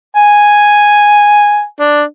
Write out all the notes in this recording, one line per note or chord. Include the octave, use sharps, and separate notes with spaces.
G#5
D4